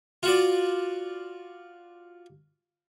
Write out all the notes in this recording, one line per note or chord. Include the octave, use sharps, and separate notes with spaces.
F4 F#4 D5